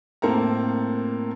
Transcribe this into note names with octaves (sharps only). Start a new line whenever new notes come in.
A2 A#3 C4 A4 A#5